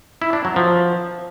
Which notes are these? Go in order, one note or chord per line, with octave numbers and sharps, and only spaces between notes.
E4
D4
F#3
F3